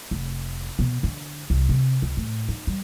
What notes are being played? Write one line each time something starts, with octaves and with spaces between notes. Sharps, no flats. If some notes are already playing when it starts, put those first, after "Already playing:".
F1
B2
D3
C2
C3
C#2
A2
D#4
G3